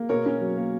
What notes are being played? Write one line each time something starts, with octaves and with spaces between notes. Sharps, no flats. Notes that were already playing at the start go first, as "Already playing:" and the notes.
Already playing: A#3
B2 A#4 C#5
C#4
F#3
A#3